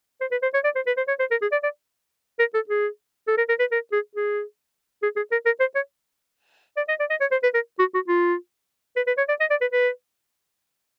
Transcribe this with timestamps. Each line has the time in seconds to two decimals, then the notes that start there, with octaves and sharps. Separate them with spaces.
0.21 C5
0.32 B4
0.43 C5
0.54 C#5
0.64 D5
0.76 C5
0.87 B4
0.97 C5
1.08 C#5
1.20 C5
1.31 A#4
1.42 G#4
1.52 D5
1.63 D5
2.39 A#4
2.55 A4
2.69 G#4
3.28 A4
3.38 A#4
3.49 A#4
3.60 B4
3.72 A#4
3.93 G#4
4.16 G#4
5.03 G#4
5.16 G#4
5.32 A#4
5.46 A#4
5.60 C5
5.75 C#5
6.77 D5
6.89 D#5
7.00 D5
7.10 D#5
7.21 C#5
7.32 C5
7.43 B4
7.55 A#4
7.79 F#4
7.94 F#4
8.08 F4
8.96 B4
9.07 B4
9.18 C#5
9.29 D5
9.41 D#5
9.50 D5
9.62 B4
9.72 B4